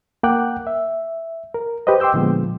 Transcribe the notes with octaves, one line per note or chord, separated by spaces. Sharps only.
A#3 A#4 F#5 G5 D6 F#6
E5
A#4
G4 B4 C5 D#5
G5 C6 D6 E6 G6
A#2 D3 F3 G#3 B3